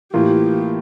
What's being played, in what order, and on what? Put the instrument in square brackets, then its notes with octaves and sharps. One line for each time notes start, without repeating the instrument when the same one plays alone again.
[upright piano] A2 E3 A#3 F4 [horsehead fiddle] G4